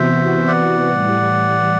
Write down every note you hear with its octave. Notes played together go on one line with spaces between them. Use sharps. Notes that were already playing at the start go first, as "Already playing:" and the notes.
Already playing: C3 E3 B3 F#4 C5 E5
D5 F#5
A2 E3 G3